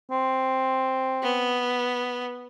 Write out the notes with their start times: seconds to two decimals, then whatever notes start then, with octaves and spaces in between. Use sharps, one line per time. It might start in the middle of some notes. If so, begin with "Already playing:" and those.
0.11 C4
1.23 B3